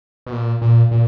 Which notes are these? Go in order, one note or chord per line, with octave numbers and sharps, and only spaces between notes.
B2
A#2
A#2
A#2